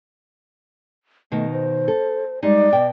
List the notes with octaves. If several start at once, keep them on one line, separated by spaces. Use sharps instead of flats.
B2 D#3 A3
C5
A4
G3 G#3 D#4 D5
B2 G5